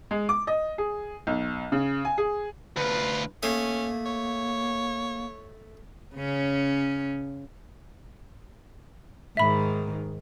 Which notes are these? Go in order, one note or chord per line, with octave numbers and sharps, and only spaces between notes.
G#3
D6
D#5
G#4
B1
C#3
G#5
G#4
D2 F4 B4
A3 A#3 C#4 D#6
C#5
C#3 C#4
G#2 D#3 E5 B5